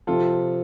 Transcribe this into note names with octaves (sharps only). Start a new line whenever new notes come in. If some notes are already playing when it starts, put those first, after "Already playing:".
C3 F3 C4 F4 A4